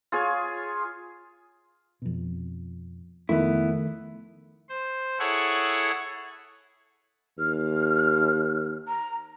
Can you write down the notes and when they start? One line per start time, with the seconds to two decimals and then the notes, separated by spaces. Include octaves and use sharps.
0.12 F4 G#4 C#5
2.02 F2 B2
3.29 F2 D#3 A3 B3 E4
4.69 C5
5.19 E4 G#4 A4 C#5 F#5
7.38 D#2 F6
8.87 A#5